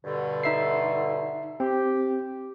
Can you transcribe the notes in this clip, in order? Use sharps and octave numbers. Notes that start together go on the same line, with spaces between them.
G2 B2 D3
D#4 E5 C7
C4 G4